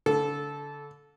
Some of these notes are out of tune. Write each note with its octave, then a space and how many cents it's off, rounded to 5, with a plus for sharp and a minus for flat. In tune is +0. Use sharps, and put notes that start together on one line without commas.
D3 -35 A4 -15